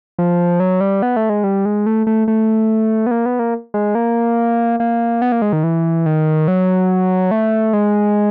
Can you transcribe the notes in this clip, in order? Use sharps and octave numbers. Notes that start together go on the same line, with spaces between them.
F3
F#3
G3
B3
A3
G#3
G3
G#3
A3
A3
A3
B3
A#3
B3
A#3
G#3
A#3
A#3
B3
A#3
G#3
D#3
E3
D#3
F#3
A3
G#3